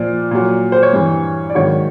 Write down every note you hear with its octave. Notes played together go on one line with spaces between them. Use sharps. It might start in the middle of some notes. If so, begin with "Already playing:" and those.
Already playing: A#2 F3 D5
A#2 F#3
C5
C#5
G2 E3
D5
G#2 D#3 F#3 C#5